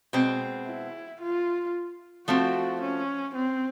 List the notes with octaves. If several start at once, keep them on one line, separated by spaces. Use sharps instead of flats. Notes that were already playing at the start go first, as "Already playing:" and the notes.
B2 G#3 C4
E4
F4
F3 A3 C4 F#4
C#4
C4